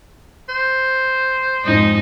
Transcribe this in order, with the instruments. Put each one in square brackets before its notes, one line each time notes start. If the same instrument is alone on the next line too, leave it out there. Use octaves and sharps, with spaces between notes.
[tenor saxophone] C5
[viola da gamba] F2 G#2 D#4